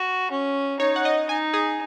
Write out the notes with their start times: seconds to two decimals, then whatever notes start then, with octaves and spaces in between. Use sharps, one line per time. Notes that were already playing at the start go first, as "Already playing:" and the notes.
Already playing: F#4
0.31 C#4
0.80 D#4 C#5
0.96 F#5
1.05 D#5
1.29 D#4 G#5
1.54 G#4